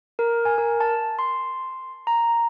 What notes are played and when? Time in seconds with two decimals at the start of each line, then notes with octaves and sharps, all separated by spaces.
0.19 A#4
0.45 G#5
0.58 A#4
0.80 A5
1.19 C6
2.07 A#5